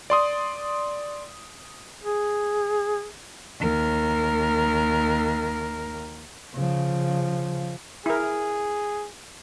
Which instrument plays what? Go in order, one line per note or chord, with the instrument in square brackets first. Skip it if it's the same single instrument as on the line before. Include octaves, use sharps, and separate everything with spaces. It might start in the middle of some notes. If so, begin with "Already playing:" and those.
[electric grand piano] D5 C6 D#6
[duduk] G#4
[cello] D#2 A#4
[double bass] C#3 F3
[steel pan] E4 A#4 [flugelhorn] G#4